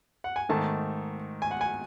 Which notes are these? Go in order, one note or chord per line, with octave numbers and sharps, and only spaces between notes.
F#5
G#5
G#2 D#3 A3 A5
G#5
F#5
G#5